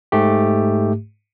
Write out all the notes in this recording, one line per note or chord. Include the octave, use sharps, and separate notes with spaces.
G#2 A3 G4